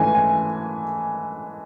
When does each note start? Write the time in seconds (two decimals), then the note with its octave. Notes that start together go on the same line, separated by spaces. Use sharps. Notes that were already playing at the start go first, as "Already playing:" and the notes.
Already playing: G#2 E3 A3 C#4 G#5
0.15 G#5